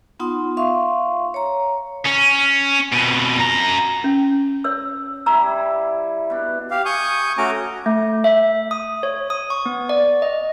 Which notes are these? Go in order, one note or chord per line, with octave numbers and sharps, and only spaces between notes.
B3 D#4 F4 F#5 C6 D#6
E5 F5 C6 C#6
C#5 A#5
C#4
F2 B2
F#2 A#5
C#4
C#5 E6
G3 E4 A#5 E6
B2 D4
G4 F5
G#5 C#6 D#6 G6
A3 C#4 F#4 G#5 A#5 D6
A3
E5
D#6
C#5
D#6
C#6
B3
D5
D#5